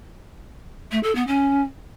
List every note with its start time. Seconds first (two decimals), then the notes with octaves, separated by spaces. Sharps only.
0.91 A3
1.03 A4
1.15 B3
1.27 C#4